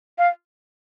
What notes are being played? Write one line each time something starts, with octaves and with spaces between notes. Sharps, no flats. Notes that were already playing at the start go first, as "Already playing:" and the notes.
F5